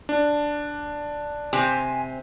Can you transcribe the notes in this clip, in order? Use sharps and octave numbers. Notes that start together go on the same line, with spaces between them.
D4
C3 C4 G4 G#5